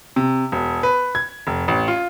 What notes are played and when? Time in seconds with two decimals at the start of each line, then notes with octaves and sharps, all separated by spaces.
0.16 C3
0.52 E1
0.83 B4
1.15 G#6
1.47 F1
1.68 A1
1.88 F4